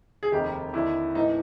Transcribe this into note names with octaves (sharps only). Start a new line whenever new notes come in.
G#4
F1 D#2 D#3 G4
D#2 D3 E4
A2 E3 D#4